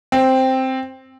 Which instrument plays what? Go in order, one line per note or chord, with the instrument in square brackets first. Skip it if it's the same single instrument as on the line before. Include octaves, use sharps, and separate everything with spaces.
[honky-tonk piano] C4